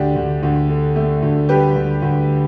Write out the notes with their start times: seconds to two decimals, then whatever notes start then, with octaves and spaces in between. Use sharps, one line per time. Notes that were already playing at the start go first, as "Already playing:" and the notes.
Already playing: D2 D4 G4
0.16 D2
0.43 D2
0.70 D3
0.96 A3
1.22 D2
1.49 G3 G4 B4
1.76 D2
2.02 D2